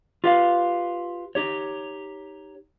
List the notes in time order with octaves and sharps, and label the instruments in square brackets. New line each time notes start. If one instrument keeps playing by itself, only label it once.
[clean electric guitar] F4 G4 B4 F5
D#4 G4 C#5